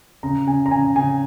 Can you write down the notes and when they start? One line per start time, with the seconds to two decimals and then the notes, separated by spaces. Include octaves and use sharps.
0.23 C#3 A#5
0.47 C#3 G#5
0.66 A#5
0.71 C#3 G#5
0.96 C#3 G#5